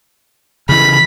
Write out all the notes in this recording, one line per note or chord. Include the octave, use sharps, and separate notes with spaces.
C#3 E3 B5